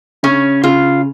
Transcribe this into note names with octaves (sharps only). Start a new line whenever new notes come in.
C#3 C#4
C#3 F4